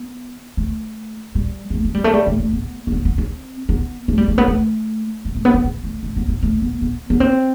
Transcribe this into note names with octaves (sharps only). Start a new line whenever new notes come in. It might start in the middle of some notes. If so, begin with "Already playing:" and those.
Already playing: B3
A3
G3
G3
A3
A3
G3
A3
G3
A3
A3
B3
A3
B3
B3
C4
B3
A3
G3
A3
B3
A3
G3
A3
B3
C4
B3
A3
A3
B3
B3
A3
B3
B3
B3
C4